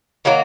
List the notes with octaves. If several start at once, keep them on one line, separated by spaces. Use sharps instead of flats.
D#3 F#3 A#3